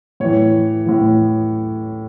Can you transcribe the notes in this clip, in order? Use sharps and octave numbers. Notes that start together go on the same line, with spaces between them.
A2 E3 C#5
A2 E3